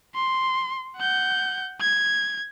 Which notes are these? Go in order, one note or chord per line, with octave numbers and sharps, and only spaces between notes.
C6
F#5 G6
G#6